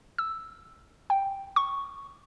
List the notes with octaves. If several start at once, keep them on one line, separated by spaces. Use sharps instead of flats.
E6
G5
C#6